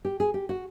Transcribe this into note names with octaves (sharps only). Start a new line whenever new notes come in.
G4
G#4
G4
F#4